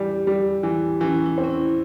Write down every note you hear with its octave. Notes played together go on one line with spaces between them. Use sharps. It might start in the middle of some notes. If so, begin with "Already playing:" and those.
Already playing: E3 G3 G4
G3
E3
E3 C#4
E4
C4
C#4
E4